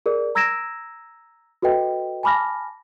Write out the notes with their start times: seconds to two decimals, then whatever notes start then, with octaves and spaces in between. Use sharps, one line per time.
0.06 G#4 A#4 D5
0.35 A#5 E6 G#6 A#6 D7 E7
1.62 F#4 A4 B4 D#5 G5
2.23 G#5 A5 B5 D6 F6 A#6